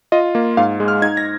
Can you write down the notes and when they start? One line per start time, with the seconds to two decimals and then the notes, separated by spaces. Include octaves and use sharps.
0.12 F4 D#5
0.35 A#3
0.57 G#2 F5
0.80 G#3
0.88 F6
1.02 D#4 G#6
1.17 A#6